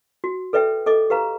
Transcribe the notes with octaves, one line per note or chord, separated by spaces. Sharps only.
F#4
A4 B4 D5 E5 G5
A4 D#5 D6
G4 B4 F5 A#5